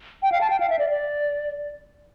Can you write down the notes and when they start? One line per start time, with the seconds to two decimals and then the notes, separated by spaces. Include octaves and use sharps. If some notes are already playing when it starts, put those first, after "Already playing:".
0.23 G5
0.32 F5
0.41 A5
0.50 G5
0.60 F5
0.70 E5
0.79 D5
0.90 D5